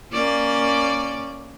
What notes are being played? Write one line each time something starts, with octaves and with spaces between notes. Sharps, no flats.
A#3 C#4 D5